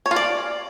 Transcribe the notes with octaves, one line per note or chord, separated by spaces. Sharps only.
C#5
F4
D5